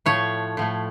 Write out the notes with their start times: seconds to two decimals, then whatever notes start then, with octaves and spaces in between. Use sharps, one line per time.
0.06 A2 F3 A3 C#5
0.57 A2 F3 A3